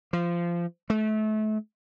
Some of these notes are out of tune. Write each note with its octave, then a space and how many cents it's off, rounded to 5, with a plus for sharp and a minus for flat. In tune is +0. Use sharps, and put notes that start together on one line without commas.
F3 -20
A3 -30